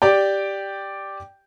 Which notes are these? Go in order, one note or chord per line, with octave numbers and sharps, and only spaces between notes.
G4 D5 G5